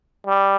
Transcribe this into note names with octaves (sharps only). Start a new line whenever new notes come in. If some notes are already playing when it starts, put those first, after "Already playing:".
G3